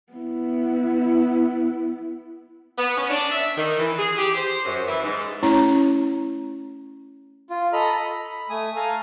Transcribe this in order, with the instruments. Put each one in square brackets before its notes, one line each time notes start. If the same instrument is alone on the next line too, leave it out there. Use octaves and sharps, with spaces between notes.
[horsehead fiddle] B3 E4
[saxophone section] B3
C#4
D4
E5
D#3
E3
G#4
G4
C5
F#2
E3
G#2
[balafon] A3 C#4 E4 C#5 A#5
[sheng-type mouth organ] F4
A4 D#5 A#5 B5
B5
B5
A3 G#5 D#6
A4 F5 G#5 A#5